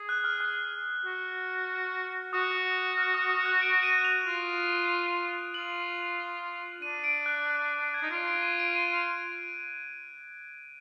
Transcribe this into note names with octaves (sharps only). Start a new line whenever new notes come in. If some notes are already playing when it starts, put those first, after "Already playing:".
Already playing: G#4
F#6
F6
F#6
F#4
F#4 D#6
F6
D#6
D#6
F#6
D7
D#7
F7
F4
F4 F#7
D4 D#7
D7
F#6
F#6
F#6
F#6
G#6
D#4
F4 D7
D7
D#7
D7
D#7